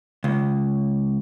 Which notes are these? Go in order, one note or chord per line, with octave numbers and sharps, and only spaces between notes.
C#2